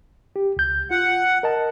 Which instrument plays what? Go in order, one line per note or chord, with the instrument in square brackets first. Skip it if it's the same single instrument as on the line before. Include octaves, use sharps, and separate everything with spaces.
[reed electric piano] G4
C#2 G6
[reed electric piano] F4 [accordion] F#5
[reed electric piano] A#4 D#5 A5